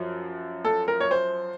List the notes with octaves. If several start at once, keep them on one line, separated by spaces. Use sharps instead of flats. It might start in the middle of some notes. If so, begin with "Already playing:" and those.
Already playing: F#2 F3
A4
A#4
C#5
C5